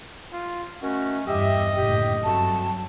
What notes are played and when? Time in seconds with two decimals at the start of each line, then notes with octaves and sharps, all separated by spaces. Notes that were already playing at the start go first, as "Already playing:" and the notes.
0.33 F4
0.82 D#3 A3 C#4 F#4
1.27 E2 G2 G3 G4 D#5 E5
1.75 F#1 A2 D3 G4
2.24 G2 F#3 A3 C4 F#4 A5